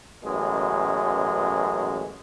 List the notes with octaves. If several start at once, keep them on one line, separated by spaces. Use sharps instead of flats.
A1 F#2 B2 G#3